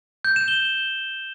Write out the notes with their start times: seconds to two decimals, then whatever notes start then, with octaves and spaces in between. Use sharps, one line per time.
0.25 G6
0.36 E7
0.48 G7